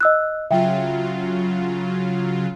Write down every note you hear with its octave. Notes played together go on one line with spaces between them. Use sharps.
D#5 E6 F#6
C#3 F#3 F4 E5 G5